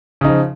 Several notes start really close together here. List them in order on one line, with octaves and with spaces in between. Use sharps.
C#3 D#4 F3